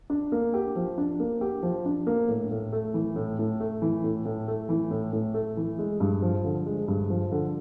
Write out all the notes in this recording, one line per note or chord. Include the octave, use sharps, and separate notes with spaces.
D4
A#3
G4
F3
D4
A#3
G4
F3
D4
A#3
A2
A2
A3
E3
A2
A2
A3
E3
A2
A2
A3
E3
A2
A2
A3
E3
G#3
G2
F3
D3
G#3
G2
F3
D3